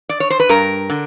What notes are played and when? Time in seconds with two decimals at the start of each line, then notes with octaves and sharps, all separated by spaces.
0.09 D5
0.20 C#5
0.30 C5
0.40 B4
0.49 G2 A#4
0.90 D3